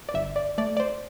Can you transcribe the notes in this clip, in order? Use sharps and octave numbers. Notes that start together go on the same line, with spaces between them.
D5
G1 E5
D5
A3 D5
D5
C5